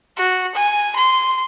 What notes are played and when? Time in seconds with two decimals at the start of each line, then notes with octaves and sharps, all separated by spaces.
0.17 F#4
0.55 G#5
0.96 C6